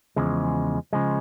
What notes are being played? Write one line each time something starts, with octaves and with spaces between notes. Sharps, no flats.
E2 C#3 F3 G#3
C#3 F3 G#3